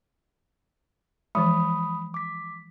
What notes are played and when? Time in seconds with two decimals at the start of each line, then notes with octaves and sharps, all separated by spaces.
1.35 E3 F3 G#3 B5 D#6
2.14 D6 B6